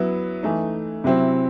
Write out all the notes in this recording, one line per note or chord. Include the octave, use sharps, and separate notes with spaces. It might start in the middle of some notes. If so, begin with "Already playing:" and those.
Already playing: F#3 B3 E4
E3 A3 D#4
C3 F#3 C4 E4